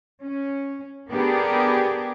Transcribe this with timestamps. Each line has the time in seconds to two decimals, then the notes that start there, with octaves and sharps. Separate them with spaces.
0.23 C#4
1.10 B3 D4 G4 G#4 A#4